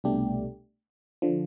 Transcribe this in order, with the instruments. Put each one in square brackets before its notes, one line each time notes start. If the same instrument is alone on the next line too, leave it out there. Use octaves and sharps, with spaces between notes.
[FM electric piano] C2 B2 A3 D4 G4
D3 F3